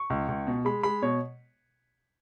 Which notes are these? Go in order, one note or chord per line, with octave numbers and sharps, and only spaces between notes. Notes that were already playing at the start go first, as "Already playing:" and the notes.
Already playing: C#6
C#2
C#2
B2
G#3 B5
G#3 B5
B2 C#5